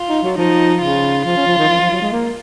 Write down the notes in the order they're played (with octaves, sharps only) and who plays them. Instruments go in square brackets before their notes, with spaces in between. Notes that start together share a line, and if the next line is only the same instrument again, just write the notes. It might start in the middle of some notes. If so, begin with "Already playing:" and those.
Already playing: [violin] F4
[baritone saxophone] D#4
F#3
[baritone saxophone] F3 [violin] D#4
[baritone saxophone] C#3 [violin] F4
[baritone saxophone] F3 [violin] F4
[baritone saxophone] C#4
F3
D#3
F3
F3
F#3
G#3
A#3